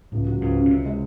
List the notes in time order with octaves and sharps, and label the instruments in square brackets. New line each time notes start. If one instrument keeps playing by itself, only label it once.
[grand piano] C#2 [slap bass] A2
[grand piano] F#3
[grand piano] C#2 [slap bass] G#2
[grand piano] C#4
[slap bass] A2
[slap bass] C3 [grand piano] C#4
[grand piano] G#3